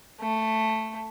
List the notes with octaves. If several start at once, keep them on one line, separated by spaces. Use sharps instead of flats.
A3